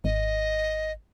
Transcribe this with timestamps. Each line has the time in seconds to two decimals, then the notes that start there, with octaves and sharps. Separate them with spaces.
0.04 G#1 D#5